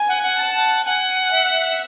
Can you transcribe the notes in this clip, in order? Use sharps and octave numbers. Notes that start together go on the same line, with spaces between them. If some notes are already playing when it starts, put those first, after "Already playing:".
Already playing: G#5
F#5
F#5
A5
F#5 G#5
E5